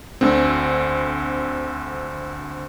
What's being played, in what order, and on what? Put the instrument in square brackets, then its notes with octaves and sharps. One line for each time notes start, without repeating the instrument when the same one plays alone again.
[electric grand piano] D2 D3 C4